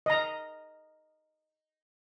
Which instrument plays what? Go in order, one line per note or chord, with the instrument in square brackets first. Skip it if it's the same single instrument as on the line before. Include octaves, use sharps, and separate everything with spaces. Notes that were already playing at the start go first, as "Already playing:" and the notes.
[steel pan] D#5 A#5